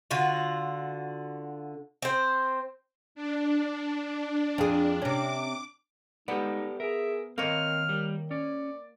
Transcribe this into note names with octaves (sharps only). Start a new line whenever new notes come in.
D3 F4 F#4
C4 C5
D4
F2 G#4
C3 C#4 D6
G#3 B3 D#4 G4 A4 D5
G#4 A#4 E5
D#3 A#3 C4 C#5 D#5 F6
G3
C#4 D5